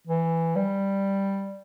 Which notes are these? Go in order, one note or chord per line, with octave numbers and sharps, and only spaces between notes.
E3
G3